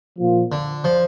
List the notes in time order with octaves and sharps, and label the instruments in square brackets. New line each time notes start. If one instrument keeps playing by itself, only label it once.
[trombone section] A#2 F3 A#3 F4
[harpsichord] D3
F3